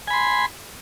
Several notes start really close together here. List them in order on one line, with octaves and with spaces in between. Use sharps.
G#5 B5 C6